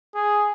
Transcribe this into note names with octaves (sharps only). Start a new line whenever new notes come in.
G#4